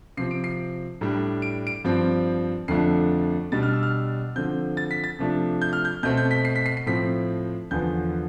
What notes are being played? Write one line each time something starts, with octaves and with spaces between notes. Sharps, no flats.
C3 F3 C4 C7
D7
C7
A2 G3 D4
D7
D7
G2 F3 C4
F2 D3 F3 A3 D4 C7
B2 G3 D4 A6
F6
E6
F6
D3 F3 C4 G6
A6
B6
A6
C3 F3 A3 D4
G6
F6
G6
B2 A3 C4 G6
G6
B6
C7
B6
C7
C7
A2 F3 C4 B6
E2 D3 F3 B3 G6